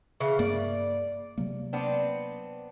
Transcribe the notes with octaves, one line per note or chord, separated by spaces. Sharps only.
C#3 E3
G2 A#3 D5
C3 F#3 A#3
B3 C4 D4